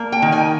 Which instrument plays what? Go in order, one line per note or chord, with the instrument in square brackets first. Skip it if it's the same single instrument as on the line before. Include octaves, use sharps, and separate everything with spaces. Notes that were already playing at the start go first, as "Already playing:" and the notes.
Already playing: [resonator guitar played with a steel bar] A#3
G5
D#3
G#5